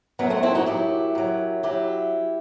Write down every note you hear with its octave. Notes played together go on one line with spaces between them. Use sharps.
F#2 F#3 B3
A3 C4
D#4
C4 E4
D#4 F#4
F#2 F#3 E4 G4
F#2 F#3
F#3 E4 G4